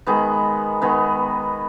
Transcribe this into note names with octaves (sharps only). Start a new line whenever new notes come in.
D#3 G#3 B3
D#3 G#3 B3